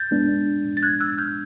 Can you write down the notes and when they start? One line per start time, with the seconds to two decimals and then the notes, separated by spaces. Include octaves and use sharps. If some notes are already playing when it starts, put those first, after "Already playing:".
Already playing: G6 A6
0.11 G#3 B3 D4
0.77 A6
0.83 F#6 G#6
1.00 E6 F#6
1.18 F6 G6